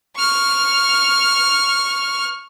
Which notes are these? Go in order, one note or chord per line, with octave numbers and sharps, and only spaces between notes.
C#6 F6